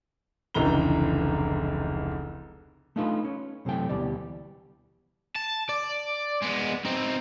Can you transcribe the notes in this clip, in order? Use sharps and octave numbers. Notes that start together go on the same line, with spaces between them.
F1 C#2 D3 E3 A#5 G7
A3 D4 D#4 F4 A4 B4
C#4
F#2 C3 E3 A3 G5
D2 B2 E3 G3 D5
A5
D5
G#3 B3
C4 D#4